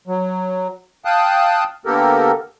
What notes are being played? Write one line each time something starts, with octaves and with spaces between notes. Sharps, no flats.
F#3
F5 G5 A5 D#6 F#6
D3 A#3 B3 G4 A4 A#4